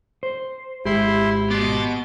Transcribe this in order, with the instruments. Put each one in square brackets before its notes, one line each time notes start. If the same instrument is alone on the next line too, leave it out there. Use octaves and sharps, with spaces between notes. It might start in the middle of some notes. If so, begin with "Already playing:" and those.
[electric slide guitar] C5
[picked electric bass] G#1 G#3 [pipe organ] E4 C6 [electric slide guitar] G4
[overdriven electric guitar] B2 B3 [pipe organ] C6 D6 A6